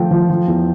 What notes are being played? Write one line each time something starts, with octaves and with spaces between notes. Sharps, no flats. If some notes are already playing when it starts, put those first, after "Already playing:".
Already playing: F3 A3 G5
F3
F3
E2